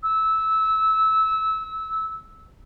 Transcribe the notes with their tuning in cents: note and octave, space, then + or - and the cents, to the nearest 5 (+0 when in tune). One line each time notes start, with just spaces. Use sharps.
E6 -20